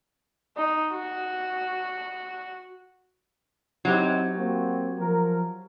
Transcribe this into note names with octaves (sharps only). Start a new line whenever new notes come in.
D#4
F#4
F#3 C4 D#4 E4 G4
A#3 C4 F#4
F3 A#4